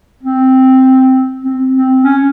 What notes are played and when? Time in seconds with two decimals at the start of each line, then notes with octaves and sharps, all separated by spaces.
0.23 C4
1.44 C4
1.74 C4
2.04 C#4